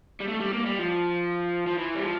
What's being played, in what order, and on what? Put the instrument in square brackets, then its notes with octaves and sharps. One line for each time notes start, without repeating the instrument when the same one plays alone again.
[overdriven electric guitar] G3
A3
G3
A#3
G3
F3
F3
E3
G3
F3